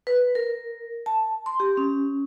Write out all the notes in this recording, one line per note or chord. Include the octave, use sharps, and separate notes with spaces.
B4
A#4
A5
C6
G4
C#4